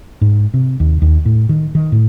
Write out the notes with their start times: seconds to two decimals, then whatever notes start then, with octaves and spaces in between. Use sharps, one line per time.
0.21 G#2
0.54 C3
0.80 D#2
1.02 D#2
1.25 A2
1.49 D#3
1.75 D#3
1.92 A2